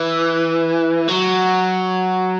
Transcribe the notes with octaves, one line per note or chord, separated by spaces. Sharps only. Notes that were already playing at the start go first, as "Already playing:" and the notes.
Already playing: E3
F#3